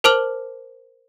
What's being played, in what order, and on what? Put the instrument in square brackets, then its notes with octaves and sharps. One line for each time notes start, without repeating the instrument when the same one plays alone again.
[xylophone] A#4 C5 A5 D6 F6 F#7